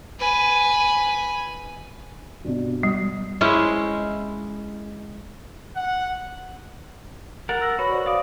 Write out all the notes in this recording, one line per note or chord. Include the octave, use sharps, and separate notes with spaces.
B4 G#5
G2 B2
G3
G#3 C#4 E4 C5
F#5
A#4 F#5 A6
E6 A#6
F#4 B4 C#5 B5
C5 D5
D5 F5 D#6 D7